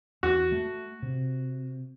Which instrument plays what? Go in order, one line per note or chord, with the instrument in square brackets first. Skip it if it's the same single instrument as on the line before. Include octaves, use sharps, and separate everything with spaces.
[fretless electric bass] E2 [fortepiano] F#4
[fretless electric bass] A3
C3